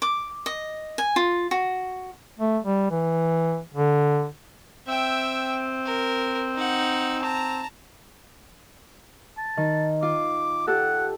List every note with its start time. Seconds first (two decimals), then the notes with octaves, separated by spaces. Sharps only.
0.02 D6
0.46 D#5
0.98 G#5
1.16 F4
1.51 F#4
2.39 A3
2.64 G3
2.91 E3
3.74 D3
4.88 C4 E5 G5
5.86 A#4
6.56 D#4 F#5
7.22 A5 A#5
9.38 A5
9.57 D#3
10.02 F4 D6
10.67 G4 A4 F#5